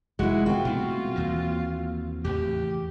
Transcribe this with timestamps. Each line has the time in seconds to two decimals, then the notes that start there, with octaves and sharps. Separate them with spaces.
0.19 F1 G#3 E4 F#4
0.46 C4 F4 F#4
0.65 B2 G3 A3
1.16 D#2 E3 A#3
2.24 E2 A2 C#3 G4